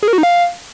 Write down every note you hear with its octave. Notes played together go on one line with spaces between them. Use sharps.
G#4
A#4
F#4
D#4
F5